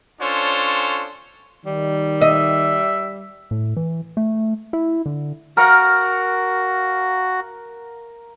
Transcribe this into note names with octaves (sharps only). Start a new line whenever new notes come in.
C#4 D4 F4 A4 C5 C#5
D#3 G3
D#5 E5
A2
E3
A3
E4
D3
F#4 A#4 F5 F#5